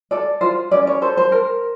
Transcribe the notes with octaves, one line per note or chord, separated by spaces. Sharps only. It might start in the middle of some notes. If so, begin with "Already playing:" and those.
A4 D5
F4 C5
C#4 D5
C#5
A4 C5
C5
A#4